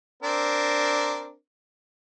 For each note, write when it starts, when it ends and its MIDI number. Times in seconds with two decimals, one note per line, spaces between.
0.23 1.32 60
0.23 1.32 62
0.23 1.32 70